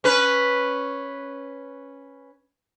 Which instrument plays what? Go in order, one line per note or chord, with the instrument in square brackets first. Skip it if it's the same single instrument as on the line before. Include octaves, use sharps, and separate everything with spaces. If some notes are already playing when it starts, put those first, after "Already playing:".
[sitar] C#4 B4